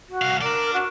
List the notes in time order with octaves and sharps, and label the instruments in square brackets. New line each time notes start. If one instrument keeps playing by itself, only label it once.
[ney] F#4
[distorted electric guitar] C2 F5
[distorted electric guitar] D4 D5 [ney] A#4
[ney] F#4